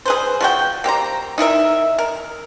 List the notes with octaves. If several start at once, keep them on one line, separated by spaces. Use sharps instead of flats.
G#4 B4 C5
F3 F#4 G5
A#3 G4 C5 A#5
D#4 E4 A#4 E5
A#4